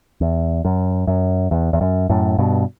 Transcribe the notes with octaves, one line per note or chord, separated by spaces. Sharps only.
E2
F#2
F#2
E2
E2
F#2
F#2 A2
G2 B2